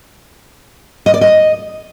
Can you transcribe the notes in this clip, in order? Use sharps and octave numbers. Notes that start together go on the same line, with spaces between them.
D#5
D5
D#5